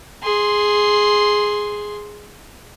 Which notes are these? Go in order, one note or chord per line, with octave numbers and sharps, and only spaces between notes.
G#4 C6